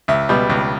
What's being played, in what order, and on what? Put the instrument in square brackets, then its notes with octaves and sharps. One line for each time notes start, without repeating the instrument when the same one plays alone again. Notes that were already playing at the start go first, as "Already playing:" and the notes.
[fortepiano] C#2 E5
B2 G3 B3
C#2